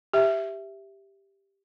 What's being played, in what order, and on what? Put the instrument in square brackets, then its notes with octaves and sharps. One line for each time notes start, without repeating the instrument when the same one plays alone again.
[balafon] G4 E5